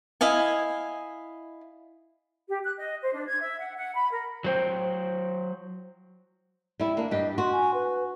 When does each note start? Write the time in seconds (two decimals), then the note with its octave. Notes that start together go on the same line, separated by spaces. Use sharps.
0.21 E4 D#5 F5 G#5
2.48 G4
2.63 F#6
2.78 D#5
3.03 C5
3.14 D4
3.29 G#6
3.41 E5
3.60 F#5
3.77 F#5
3.94 B5
4.11 A#4
4.44 F#3 C5 G5
6.80 G3 E4
6.97 A#3 D4
7.11 G2 G4 D#5
7.38 F#4 C6
7.52 G#5
7.74 B4